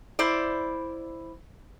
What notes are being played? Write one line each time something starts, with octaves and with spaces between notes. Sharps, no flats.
E4 C5 D5